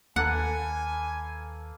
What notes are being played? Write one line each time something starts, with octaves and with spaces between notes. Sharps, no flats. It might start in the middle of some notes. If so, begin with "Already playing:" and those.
D#2 A#3 A4 B4 F#5 G#5